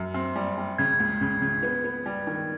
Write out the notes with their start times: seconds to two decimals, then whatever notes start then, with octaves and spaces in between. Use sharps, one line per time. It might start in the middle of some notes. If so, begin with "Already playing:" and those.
Already playing: F#2
0.14 C4
0.36 G3
0.58 G3
0.78 C#3 G#6
1.00 C#2
1.21 C#3
1.42 C#3
1.63 B3
1.84 B3
2.06 G3
2.27 D#3